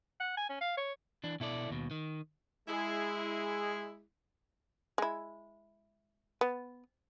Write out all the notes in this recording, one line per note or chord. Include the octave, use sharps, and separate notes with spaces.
F#5
G#5
C#4
F5
C#5
E3 D4
B2 E4 A4 D5
D#2 B2
D#3
G#3 E4 G#4
G#3 E4
B3